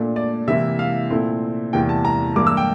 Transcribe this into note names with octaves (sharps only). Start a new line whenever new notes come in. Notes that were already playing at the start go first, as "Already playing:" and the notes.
Already playing: A#2 A3 D4
D5
C3 E3 A#3 E4 E5
F5
A#2 A3 C4 E4
E2 C3 E3 A#3 G5
A5
A#5
G2 E3 A#3 E4 D6
E6
G5